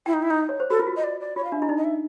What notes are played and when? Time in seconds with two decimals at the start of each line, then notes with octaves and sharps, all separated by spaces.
0.06 E4 G5
0.13 D#4
0.22 E4
0.30 D#4
0.49 C#5
0.60 C5
0.70 F#4 A4
0.79 F4 A#4
0.87 F#4
0.95 F4 D#5
1.04 D5
1.20 D5
1.36 F4 C#5
1.44 F5
1.52 D4 E5
1.60 E4 D#5
1.69 D#4 D5
1.77 D#5
1.84 E5